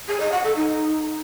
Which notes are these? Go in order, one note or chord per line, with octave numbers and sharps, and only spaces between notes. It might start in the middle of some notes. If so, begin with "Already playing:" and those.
G#4
D#5
F#5
A4
D#4